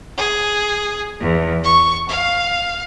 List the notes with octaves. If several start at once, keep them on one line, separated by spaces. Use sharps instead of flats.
G#4
E2
C#6
F5